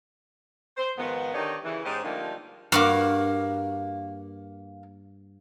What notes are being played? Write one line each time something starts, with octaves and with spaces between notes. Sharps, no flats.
C5
G#2 D#3 F3 B3
D3 D#3 D#4 G4 C#5 D5
C#3 E3
G#2 C#4 D#4 G4 C5
D3 F3 G3 A3 A#3 D#4
G2 A#3 F#4 B5 D6 F6